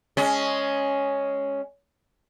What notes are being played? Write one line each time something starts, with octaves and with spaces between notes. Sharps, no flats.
G#3 C#4